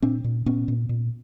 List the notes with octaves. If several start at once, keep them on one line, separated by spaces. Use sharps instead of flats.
A#2 C4 D4
A#2
A#2 B3 C#4
A#2
A#2